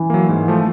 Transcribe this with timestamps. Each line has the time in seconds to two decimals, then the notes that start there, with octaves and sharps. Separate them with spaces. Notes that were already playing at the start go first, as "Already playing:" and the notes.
Already playing: E3
0.10 F#3 A#3
0.29 G#2
0.48 F3 A3